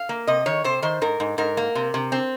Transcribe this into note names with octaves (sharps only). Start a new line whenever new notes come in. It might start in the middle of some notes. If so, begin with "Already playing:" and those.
Already playing: F5
A#3
C3 D#5
D#3 C#5
C3 C5
D#3 C5
G#2 A#4
G#2
G#2 A#4
A#3
C3
C3
C4